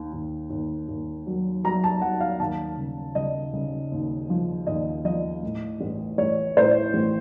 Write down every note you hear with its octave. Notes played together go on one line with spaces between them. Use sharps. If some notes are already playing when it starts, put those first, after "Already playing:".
Already playing: D#2 D#3
D#2
D#2
D#2
F#3
F#3 A#5
A5
F#3 F#5
F5
D#2 A5
C#3
C#3 D#5
C#3
D#2
F3
D#2 D#5
F3 D#5
A2
A1
A1 C#5
A2 C5
A1